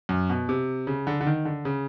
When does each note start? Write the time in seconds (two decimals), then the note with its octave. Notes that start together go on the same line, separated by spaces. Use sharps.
0.09 F#2
0.29 B2
0.49 C3
0.87 C#3
1.07 D3
1.21 D3
1.27 D#3
1.45 D3
1.65 C#3